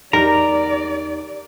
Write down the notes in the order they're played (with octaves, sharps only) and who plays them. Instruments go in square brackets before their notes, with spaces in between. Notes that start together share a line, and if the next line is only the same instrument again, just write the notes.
[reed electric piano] E2 D#4 G4 [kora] A#4 [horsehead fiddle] D5 [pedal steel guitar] A#5